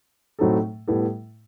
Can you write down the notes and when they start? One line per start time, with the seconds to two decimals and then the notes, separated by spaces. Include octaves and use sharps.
0.39 A2 F#3 C4 D#4 A4
0.88 A2 G3 B3 E4 A4